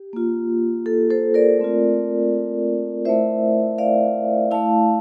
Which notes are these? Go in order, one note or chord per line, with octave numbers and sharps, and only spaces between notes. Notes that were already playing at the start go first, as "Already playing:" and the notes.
Already playing: G4
A#3 F4
A4
A4 C5
A#4 D5
A3 C4 F4
A3 E4 C5 E5
D5 F5
A3 E4 F5 A5